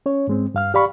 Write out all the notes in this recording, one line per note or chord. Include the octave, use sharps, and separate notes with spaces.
C#4 C#5
G#2 G#3 C4
G2 F5 F6
G4 D5 F5 B5 C#6